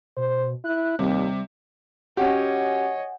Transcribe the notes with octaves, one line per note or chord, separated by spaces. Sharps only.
B2 C5
E4 F#6
D#2 C3 G3
C#4 F#4 G4 C#5 D#5 F#5 G#5